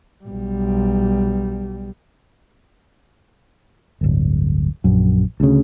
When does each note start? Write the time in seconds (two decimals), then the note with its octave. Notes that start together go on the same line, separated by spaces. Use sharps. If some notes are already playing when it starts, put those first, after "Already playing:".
0.25 B1 G3
4.01 D1 G1
4.84 A#1 F#2
5.40 D2 C#3